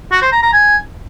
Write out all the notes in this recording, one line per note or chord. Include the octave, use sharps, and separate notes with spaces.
F#4
C5
A#5
A#5
G#5